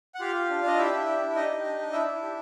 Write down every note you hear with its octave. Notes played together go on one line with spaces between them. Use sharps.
F#5
F4 G4 F5
G4
D4
D4 D#5
E4 G4 E5
D4
G4
D4
D#4 G4 D#5
G4
D4
D4
D4 E4 E5
D4
G4